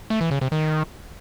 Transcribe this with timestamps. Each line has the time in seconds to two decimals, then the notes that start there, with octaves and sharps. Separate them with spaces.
0.10 A3
0.21 E3
0.31 C#3
0.41 C3
0.52 D#3